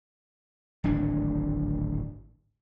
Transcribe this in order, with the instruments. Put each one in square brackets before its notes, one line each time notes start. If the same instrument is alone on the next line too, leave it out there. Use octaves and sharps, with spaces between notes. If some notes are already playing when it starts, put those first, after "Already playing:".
[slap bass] D1 G#1 A2 D4